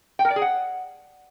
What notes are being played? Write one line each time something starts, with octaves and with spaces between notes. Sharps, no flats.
G5
A#4
D5
G#4
F#5